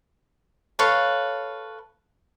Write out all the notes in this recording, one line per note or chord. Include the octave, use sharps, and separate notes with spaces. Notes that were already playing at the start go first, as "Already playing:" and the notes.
A4 B4 C#5 F5